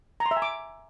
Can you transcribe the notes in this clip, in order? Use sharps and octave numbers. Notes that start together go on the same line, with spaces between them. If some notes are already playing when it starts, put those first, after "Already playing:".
A#5
C6
E5
G#5
D6